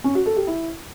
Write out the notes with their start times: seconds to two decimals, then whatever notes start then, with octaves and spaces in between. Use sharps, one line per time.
0.04 C#4
0.15 F#4
0.26 A4
0.36 G4
0.47 E4